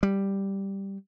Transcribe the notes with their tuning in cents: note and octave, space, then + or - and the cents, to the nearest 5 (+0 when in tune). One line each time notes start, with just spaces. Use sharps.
G3 +0